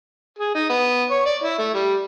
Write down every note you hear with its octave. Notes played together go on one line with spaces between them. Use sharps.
G#4
D#4
B3
C#5
D5
E4
A3
G3